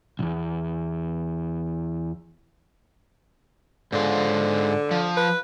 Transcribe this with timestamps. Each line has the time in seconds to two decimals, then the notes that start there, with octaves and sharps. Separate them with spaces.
0.19 B1 E2
3.93 G#2 D3 F4
4.91 F3
5.17 B4